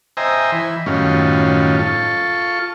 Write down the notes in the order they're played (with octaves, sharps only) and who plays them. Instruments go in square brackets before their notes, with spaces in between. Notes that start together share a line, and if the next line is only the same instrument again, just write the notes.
[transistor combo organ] C5 D#5 E5 G5 G#5 A#5
E3 B5
F#2 A2 D#3 G3 C#4 F4
F4 A4 C#6